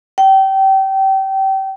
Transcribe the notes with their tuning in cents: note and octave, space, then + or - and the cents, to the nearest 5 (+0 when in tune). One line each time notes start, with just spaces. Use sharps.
G5 -25